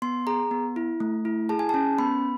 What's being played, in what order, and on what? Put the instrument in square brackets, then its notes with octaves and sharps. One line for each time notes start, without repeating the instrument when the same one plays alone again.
[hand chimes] B3 C6
G#4 A#5
B3
E4
A3
E4
G#4 A5
G#5
A5
C#4
B3 B5